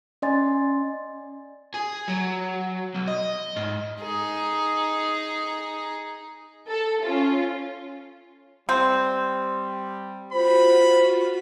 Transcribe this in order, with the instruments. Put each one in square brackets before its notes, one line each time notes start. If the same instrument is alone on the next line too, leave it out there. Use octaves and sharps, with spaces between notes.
[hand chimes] C#4 D5 D#5 G#5 C6 A6
[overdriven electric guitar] G#4
F#3
B1
D#5
G#2
[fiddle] D#4 G#4
[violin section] A4
C#4 F4
[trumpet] G3 [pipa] C4
[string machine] F4 F#4 [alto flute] C5 [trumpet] B5